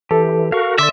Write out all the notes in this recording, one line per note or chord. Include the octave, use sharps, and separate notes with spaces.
E3 G4 A4
F#4 A#4 F5 C#6
D3 D5 E5 C6 D6